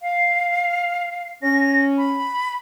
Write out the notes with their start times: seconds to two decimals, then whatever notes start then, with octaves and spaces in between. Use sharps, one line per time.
0.02 F5
1.43 C#4 A#6
1.98 B5